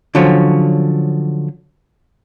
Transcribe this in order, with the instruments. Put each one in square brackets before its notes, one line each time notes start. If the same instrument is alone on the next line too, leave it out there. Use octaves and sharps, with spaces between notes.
[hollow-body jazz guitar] D3 F3 F#3 C#4